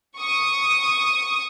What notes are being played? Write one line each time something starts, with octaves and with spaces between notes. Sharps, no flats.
C#6 D#6